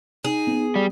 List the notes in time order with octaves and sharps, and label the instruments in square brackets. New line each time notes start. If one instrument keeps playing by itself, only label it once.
[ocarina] D#4 [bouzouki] G#4
[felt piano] B3
[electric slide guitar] G3